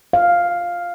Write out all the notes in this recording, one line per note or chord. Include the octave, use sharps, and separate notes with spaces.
F5